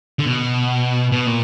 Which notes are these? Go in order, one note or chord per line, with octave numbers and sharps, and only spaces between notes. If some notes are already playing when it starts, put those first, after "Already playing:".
D3
B2
B2
A#2